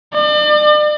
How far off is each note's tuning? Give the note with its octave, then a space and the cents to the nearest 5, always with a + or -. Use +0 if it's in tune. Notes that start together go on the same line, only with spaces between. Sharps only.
D5 +40